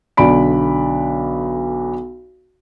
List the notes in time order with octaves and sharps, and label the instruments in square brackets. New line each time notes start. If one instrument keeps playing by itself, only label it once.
[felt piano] B1 D3 D4 D5 B5 D7